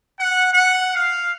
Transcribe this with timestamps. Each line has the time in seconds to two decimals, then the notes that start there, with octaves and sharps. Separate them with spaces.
0.20 F#5
0.53 F#5
0.95 F5